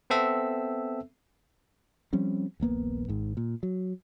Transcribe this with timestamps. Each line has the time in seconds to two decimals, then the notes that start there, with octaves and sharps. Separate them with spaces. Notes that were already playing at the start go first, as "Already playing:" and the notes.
0.10 B3 C4 A4 E5 E6
2.13 F3 G3 C4 C#4
2.60 D#1 A#1 A#3 B3
3.08 G#1 G#2
3.37 A#2
3.63 F#3